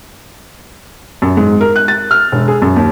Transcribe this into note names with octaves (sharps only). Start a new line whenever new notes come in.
F#2
G#2
A#4
F#6
A6
F6
E1
G#4
F#2
D#2